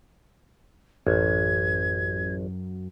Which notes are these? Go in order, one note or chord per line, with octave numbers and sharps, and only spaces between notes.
A1 F#2 G#6